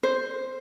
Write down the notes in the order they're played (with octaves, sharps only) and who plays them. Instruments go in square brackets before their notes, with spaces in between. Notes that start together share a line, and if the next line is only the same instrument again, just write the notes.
[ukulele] C5